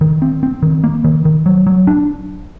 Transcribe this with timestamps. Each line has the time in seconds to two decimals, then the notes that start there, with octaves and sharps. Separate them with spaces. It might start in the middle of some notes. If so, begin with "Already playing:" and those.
0.01 D#3
0.22 C4
0.43 C4
0.62 D#3
0.84 A#3
1.04 D#3
1.25 D#3
1.46 F#3
1.67 F#3
1.87 D4